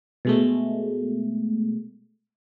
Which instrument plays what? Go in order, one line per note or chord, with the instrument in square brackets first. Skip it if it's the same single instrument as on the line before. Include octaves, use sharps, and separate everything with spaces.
[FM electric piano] B2 G#3 A3